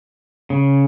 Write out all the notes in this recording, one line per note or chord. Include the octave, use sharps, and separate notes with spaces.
C#3